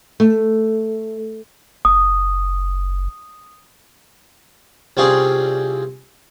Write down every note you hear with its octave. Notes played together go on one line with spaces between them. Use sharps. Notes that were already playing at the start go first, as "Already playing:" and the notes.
A3
F#1 D#6
C2 C4 C#4 F4 G#4 D5